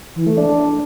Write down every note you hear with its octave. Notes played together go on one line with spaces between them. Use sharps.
E3
A3
D4